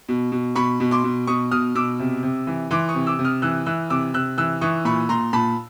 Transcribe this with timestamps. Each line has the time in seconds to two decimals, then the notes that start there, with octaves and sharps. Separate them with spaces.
0.09 B2
0.32 B2
0.55 B2 B5 C#6
0.80 B2
0.91 C6 D6
1.04 B2
1.27 B2 C#6 D#6
1.51 B2 D#6 F6
1.75 B2 D6 E6
1.99 C3
2.23 C3
2.47 E3
2.71 E3 C6 D6
2.89 C#6 D#6
2.94 C3
3.06 D6 E6
3.19 C3
3.24 D#6 F6
3.42 E3 E6 F#6
3.66 E3 E6 F#6
3.90 C3 D6 E6
4.14 C3 E6 F#6
4.38 E3 E6 F#6
4.61 E3 C#6 D#6
4.85 A#2 B5 C#6
5.09 A#2 A#5 C6
5.33 A#2 A5 B5